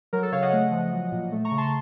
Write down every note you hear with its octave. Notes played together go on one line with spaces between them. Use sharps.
F#3 A#4
A4
C#3 C#5 F5
D#5 F#5
A3
F3
F#3
A#2
A3
A#5 C#6
C#3
A5 C6